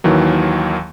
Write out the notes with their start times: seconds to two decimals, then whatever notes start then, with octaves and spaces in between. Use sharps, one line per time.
0.04 D#2 D#3 E3 F#3